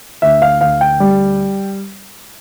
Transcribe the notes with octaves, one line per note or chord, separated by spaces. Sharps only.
D2 E5
F5
D2 F5
G5
G3